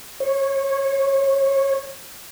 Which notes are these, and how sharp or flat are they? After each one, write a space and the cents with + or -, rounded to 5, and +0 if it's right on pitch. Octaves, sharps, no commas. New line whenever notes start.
C#5 -25